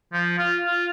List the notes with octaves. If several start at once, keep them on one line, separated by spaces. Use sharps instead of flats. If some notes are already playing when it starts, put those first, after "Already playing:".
F3
F4
F4